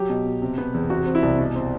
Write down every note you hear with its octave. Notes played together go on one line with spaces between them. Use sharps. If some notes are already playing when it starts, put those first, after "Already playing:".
Already playing: F#3 G4
B2
B2
C3
B3
E2
C3 F#4
C4
E4
C2
B2
C4